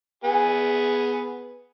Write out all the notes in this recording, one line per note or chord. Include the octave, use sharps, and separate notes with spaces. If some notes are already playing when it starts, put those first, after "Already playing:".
B3 G#4 G#5